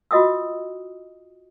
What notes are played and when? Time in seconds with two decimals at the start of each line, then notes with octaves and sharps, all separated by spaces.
0.11 F4 F#4 D#5 G5 D#6 E6